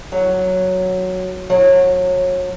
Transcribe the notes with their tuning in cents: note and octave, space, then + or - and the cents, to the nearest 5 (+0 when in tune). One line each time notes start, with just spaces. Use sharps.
F#3 +0
F#3 -30